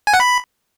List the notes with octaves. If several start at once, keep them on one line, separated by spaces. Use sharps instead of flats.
G#5
F#5
B5